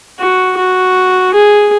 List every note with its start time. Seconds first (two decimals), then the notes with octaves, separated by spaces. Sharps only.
0.19 F#4
0.57 F#4
1.34 G#4